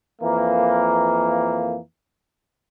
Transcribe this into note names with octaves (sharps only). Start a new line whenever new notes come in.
F2 E3 A#3